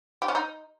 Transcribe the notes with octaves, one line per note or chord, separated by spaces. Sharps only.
G4
C#4
D#4